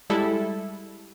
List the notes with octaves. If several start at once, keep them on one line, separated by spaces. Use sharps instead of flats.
G3 G#3 E4 A4